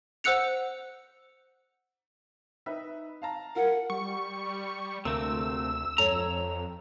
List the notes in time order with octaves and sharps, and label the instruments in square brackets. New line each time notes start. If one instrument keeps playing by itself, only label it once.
[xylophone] C5 F#5 E6 F#6 C#7 F7
[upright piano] D#4 B4 E5
F5 A5 A#5
[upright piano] F4 [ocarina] A#4 [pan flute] F#5
[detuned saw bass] G3 [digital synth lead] C#6
[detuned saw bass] D2 [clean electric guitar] C3 A3 C4 [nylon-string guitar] A#3 [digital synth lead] E6
[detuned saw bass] F2 [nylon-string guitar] A4 C#5 G#5 [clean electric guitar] A#5